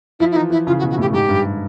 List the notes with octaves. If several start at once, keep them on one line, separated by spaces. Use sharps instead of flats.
F3 E4
E4
E3 D#4
E3 E4
C#3 F4
F#4
B2
F#4
A2 G4
G#2 G4
G2